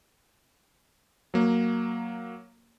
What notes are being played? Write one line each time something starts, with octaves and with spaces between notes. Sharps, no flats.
F#3 A#3